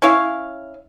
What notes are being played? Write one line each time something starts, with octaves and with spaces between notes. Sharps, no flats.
C#4 E4 C#5 F5